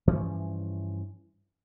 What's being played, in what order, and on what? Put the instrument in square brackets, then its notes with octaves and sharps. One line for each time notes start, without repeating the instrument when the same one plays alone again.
[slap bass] G2 E3 F3 C#4